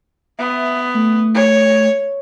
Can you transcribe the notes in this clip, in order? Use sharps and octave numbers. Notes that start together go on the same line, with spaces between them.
B3 E5
A3
C#5